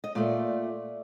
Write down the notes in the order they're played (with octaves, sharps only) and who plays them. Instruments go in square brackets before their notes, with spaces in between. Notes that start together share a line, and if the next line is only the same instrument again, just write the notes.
[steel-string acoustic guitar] D#5
A#2 A3 D5